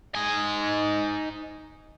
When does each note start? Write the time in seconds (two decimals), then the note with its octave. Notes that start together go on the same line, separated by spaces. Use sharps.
0.15 D#4 G#5